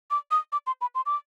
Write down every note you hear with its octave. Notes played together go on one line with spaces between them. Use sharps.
D6
D#6
D6
C6
B5
C6
D6